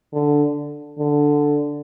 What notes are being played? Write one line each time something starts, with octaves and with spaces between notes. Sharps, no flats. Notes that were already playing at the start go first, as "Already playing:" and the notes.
D3
D3